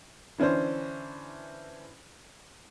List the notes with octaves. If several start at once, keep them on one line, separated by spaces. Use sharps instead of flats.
D3 E3 C#4 D4 C5